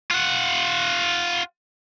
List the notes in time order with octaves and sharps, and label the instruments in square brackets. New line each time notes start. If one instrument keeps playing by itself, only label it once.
[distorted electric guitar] F4 F#5